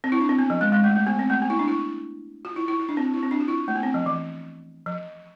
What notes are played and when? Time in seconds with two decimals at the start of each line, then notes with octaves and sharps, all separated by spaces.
0.04 C4
0.12 E4
0.21 D4
0.29 C4
0.39 B3
0.50 F3
0.61 G#3
0.72 G#3
0.84 A3
0.96 A3
1.07 B3
1.19 C4
1.30 A3
1.42 B3
1.50 E4
1.59 D4
1.68 E4
2.45 F4
2.56 E4
2.68 E4
2.79 E4
2.89 D4
2.97 C4
3.14 E4
3.23 C4
3.31 D4
3.40 F4
3.48 E4
3.68 A3
3.76 B3
3.83 C4
3.94 F3
4.06 E3
4.86 F3